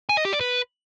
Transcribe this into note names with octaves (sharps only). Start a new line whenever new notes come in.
G#5
D#5
G4
D5
B4